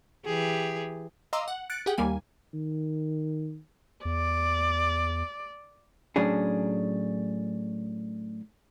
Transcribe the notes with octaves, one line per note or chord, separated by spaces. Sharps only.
E3 G4 G#4
D#5 F5 A#5 C6 D6 E6
F#5
F#6 A6 C#7 D7
G4 G#4 F#5 G5
D#2 G3 A#3 G#5
D#3
E2 D5
A2 F#3 C#4 D4 G#4